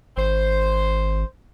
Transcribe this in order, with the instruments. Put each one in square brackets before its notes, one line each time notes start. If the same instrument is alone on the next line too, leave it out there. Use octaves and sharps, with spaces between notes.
[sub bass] G#1 [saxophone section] C5